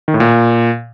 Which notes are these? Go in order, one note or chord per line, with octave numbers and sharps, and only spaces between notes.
D#3
A2
A#2